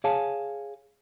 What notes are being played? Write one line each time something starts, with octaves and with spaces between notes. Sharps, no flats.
G#4 C#5 F5 G#5 A5